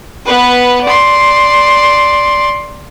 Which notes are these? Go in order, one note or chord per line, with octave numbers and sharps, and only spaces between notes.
B3 B4
D5 C6